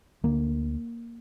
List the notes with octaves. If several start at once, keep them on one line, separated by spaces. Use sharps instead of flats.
D2 D3 A#3